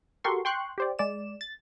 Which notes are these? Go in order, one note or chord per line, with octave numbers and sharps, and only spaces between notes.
F#4 G4 A4 A#4 C6 C#6
G5 C6 C#6 F#6
G4 C5 D5
G#3 D5 E7
A6